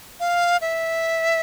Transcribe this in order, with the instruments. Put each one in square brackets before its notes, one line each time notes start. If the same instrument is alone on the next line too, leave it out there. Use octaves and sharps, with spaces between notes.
[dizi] F5
E5